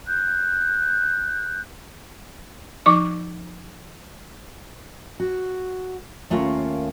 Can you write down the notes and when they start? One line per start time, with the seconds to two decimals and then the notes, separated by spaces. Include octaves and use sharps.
0.06 F#6 G6
2.86 F3 D#4 C#6 D6
5.20 F#4
6.30 D#2 A3 C#4 F4 A#4 F5